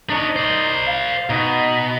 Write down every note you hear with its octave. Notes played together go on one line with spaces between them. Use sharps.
D4 D#4 C#5
C5 D5
F5
B2 D#4